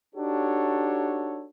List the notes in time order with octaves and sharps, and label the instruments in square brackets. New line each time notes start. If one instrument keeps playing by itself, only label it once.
[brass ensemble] D4 D#4 F#4 G4 A4 C#5